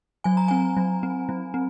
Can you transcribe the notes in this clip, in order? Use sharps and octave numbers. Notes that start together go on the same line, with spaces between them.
F#3 G#5
A#5
C4 G#5
F#3
C4
F#3
C4